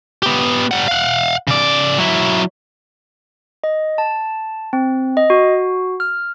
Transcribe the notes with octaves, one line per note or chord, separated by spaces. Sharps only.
B3 G4
G3 F#5
F5 F#5
C#3 D5
F#3 E4
D#5
A5
C4
D#5
F#4
F6